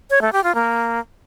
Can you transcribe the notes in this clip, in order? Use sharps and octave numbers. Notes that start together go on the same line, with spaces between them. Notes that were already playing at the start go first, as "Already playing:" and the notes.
C#5
A3
G4
F4
A#3